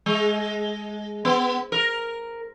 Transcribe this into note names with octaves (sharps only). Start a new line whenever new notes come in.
G#3
B3
A#4